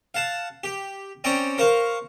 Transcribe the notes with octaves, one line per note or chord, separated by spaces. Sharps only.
F5 F#5 A5
G4
C4 C#4 D5 G5 A#5
A#4 C5 F5 C#6